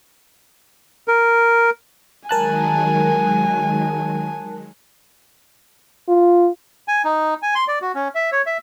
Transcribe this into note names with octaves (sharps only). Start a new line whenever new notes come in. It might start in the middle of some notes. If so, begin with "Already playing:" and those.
A#4
D#3 F#3 G#3 A#4 G#5 A5 F#6
F4
G#5
D#4
G#5
C6
D5
F#4
C#4
E5
C#5
E5